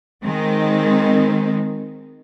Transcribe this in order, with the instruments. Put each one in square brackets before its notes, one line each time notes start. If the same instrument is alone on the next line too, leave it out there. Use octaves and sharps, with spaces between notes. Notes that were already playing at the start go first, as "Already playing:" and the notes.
[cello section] D#3 G#3 C4